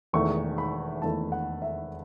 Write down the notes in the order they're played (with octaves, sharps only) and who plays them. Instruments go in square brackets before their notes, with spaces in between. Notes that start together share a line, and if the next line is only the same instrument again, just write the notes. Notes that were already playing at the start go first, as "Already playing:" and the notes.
[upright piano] E1 E2 D#3 A3 C#6
B5
E1 E2 D#3 A3 A5
F#5
E5